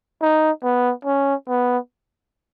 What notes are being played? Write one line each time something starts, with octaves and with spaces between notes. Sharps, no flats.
D#4
B3
C#4
B3